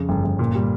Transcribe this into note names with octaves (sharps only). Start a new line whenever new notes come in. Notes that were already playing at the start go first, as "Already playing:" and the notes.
Already playing: F2 C#3
G1
G1
A#2
G3